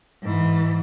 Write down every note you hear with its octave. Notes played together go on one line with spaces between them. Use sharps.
G#2 E3